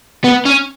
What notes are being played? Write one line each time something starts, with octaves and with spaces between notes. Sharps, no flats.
B3
C#4